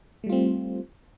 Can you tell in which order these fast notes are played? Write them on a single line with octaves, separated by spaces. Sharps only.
A3 G3 F4 C4